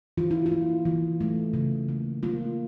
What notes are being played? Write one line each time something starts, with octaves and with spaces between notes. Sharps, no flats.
E3 F4
E4
F4
A#3
E3
A3
C#3
A#3
A#3 F4